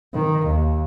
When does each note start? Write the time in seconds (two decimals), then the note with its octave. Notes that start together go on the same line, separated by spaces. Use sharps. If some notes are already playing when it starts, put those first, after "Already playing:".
0.14 D#3
0.47 D#2